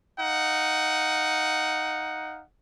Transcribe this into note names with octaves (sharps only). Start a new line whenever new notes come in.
D#4 F5 F#5